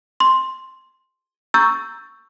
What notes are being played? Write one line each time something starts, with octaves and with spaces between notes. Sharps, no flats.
C6
A#5 C#6 E6 G6 A6